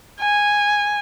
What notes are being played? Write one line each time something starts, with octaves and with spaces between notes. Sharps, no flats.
G#5